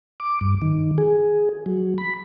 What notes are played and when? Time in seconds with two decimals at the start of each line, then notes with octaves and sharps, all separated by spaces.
0.20 D6
0.41 G2
0.62 D#3
0.98 G#4
1.66 F#3
1.98 B5